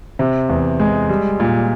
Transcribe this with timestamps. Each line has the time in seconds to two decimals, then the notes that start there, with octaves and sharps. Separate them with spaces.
0.19 C3
0.49 E2
0.80 G#3
1.09 G3
1.40 A#2